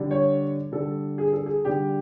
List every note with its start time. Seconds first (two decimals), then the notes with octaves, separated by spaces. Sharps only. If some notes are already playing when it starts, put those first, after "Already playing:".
Already playing: D3 G3
0.11 C#5
0.72 D3 G3 A4
1.18 G#4
1.33 A4
1.46 G#4
1.65 D3 G3 G4